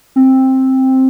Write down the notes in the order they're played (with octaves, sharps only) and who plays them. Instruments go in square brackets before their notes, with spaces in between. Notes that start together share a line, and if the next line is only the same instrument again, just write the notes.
[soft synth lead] C4